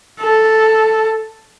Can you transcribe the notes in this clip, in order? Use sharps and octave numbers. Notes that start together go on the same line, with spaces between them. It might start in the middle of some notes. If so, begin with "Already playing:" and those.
A4